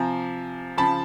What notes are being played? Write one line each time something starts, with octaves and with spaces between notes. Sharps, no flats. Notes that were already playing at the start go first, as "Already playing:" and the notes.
Already playing: C3 F3 G#5 A#5
C#3 F3 A5 B5